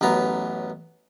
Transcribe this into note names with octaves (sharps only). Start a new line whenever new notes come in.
A1 F#2 B3 A#5